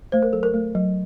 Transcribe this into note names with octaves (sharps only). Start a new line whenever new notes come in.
A3 C5
A#4
F#3 A4
A#4
A3
F#3